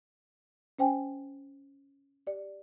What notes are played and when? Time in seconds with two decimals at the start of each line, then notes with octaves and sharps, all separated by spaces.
0.79 C#4 C5 G5 G#5
2.27 G4 D5